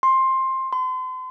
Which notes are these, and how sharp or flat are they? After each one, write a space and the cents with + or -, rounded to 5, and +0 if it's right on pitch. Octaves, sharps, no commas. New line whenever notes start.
C6 +15
C6 -40